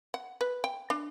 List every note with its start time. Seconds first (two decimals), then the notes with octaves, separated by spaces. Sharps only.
0.14 F#5
0.41 B4
0.64 G5
0.90 D4